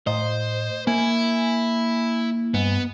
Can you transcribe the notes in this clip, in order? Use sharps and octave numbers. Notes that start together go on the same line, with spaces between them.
A2 C5 D#5
A#3 E4 G#5
G2 B3